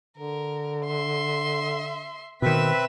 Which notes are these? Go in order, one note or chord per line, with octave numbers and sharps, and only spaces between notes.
D3 A#4
E5 C6
B2 D#3 C4 B4 E5 B6 E7